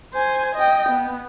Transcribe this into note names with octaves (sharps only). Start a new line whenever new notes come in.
C5 G#5
D#5 G5
B3